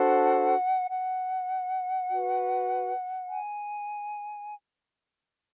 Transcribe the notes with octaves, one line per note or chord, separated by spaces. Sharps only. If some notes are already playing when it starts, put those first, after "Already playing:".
Already playing: D4 F#4 A4 C5 F#5
F#5
F#4 B4
G#5